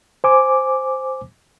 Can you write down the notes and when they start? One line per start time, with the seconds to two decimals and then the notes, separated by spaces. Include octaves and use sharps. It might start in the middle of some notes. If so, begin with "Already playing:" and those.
0.24 C5 G#5 D6